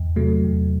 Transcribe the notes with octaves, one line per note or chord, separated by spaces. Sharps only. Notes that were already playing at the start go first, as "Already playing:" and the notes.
Already playing: E2
C3 F#3 A3
E2